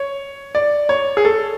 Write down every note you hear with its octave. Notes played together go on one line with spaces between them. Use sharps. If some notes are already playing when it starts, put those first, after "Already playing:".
Already playing: C#5
D5
C#5
G#4
A4